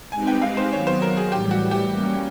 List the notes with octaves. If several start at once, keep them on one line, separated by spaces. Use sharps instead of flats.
G#3 C4 D#4 G4 B4 G#5
G5
F5
C5
D#3 F#3 B3 C#5
C5
A#4
G#4
A2 E3 G3 G4
F#4
G4
G3 A#3 C#4